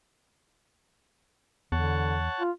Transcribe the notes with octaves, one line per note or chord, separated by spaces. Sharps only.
E2 D3 C#5 F#5 A5
F4